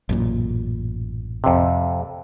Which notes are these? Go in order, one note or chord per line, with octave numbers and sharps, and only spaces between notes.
A1 F#2 A#2
F2 C3